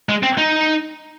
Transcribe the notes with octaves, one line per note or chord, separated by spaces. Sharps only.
G#3
C4
D#4